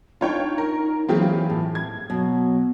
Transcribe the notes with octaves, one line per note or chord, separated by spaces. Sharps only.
D4 D#4 F4 C#5 G5
A#4
E3 F#3 A#3 C4 F4 G4 G#4
A2
G#6
B2 F#3